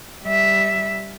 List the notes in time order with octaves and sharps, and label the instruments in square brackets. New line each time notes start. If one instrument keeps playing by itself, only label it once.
[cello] G3 E5